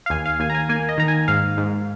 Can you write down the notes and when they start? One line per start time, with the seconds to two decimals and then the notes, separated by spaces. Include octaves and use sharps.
0.06 F5
0.10 D#2 G#5
0.26 F5
0.40 D#2 G#5
0.50 A#5
0.55 G#5
0.69 A#3 G#5
0.89 D#5
0.98 D#3 A#5
1.08 G#5
1.28 G#2 F5
1.57 G#2